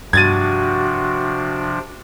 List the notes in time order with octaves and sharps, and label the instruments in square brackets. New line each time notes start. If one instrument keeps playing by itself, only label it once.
[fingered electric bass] G2 [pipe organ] C3 F3 D4 [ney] F#4 [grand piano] G#6 A6 D#7